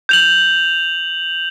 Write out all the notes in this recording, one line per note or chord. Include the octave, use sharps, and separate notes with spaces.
G6 F7 F#7